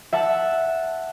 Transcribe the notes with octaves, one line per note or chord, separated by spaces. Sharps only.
E5 F#5 A5 E6